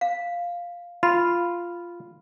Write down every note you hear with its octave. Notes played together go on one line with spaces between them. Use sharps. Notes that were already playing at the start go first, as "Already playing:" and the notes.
F5
F4 B5